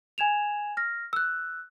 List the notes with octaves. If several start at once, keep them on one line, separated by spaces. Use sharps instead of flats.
G#5 G#6 E7 F7
F6 A#6
E6 F#6